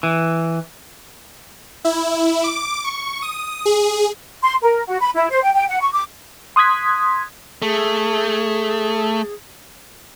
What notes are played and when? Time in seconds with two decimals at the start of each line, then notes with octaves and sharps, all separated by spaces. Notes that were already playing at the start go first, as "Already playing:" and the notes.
0.03 E3
1.85 E4
2.44 D6
2.84 C#6
3.22 D#6
3.65 G#4
4.43 C6
4.62 A#4
4.87 F#4
5.00 B5
5.15 E4
5.30 C5
5.43 G5
5.54 G5
5.69 F#5
5.81 C#6
5.94 D6
6.56 C6 D#6 F#6 G#6 B6
7.62 A3 G#4